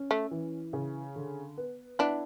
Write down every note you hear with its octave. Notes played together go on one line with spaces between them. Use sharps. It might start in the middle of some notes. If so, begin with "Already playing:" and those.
Already playing: C#4
A3
E3
C#3
D3
B3
B3 D4 E4